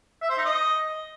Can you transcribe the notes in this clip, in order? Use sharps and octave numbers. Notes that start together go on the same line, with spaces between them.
E5
C5
D#4
D#5